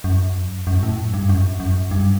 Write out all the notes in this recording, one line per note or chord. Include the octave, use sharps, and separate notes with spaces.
F#2
F#2
A2
G2
F#2
F#2
G2